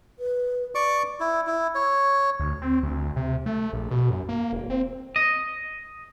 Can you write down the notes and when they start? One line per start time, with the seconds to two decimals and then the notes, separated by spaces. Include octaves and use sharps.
0.19 B4
0.75 D5 C#6 D6
1.20 E4
1.47 E4
1.75 C#5
2.40 D2
2.62 C4
2.83 D2
3.16 C3
3.46 A3
3.73 A#1
3.91 B2
4.10 F#2
4.29 A#3
4.53 E1
4.70 C4
5.16 D#5